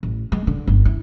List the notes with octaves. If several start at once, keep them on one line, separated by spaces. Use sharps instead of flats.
A1
G#3
D3
G1
E4